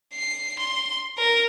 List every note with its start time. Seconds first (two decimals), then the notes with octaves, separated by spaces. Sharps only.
0.13 C7
0.59 C6
1.18 A#4